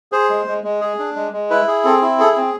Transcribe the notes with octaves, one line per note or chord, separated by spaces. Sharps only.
G#4 C5
G#3
G#3
G#3
G#4
D4
G#3
G#3
E4 B4
G#4
C4 A4
E4
G#4 A4
C4